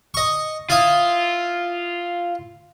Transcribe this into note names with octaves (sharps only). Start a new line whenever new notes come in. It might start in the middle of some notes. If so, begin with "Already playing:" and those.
D#5 C#6
E4 F4 E5 D#6